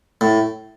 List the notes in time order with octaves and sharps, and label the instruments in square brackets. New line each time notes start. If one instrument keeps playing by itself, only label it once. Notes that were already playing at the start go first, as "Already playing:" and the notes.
[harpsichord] A2